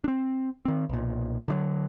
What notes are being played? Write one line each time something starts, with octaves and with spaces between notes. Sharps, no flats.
C4 D4
D#3 C4
B1 A#2
D3 D#3 F#3